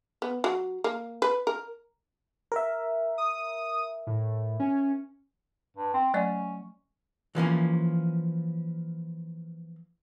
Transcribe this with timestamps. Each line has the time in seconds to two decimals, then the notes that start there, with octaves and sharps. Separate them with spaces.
0.22 B3
0.44 F#3
0.84 A#3
1.22 B4
1.47 A#4
2.52 A#4 E5
3.18 D#6
4.07 A2
4.60 C#4
5.77 G2
5.93 C4
6.14 F#3 A3 C#4 D5
7.35 E3 F3 A#3 C#4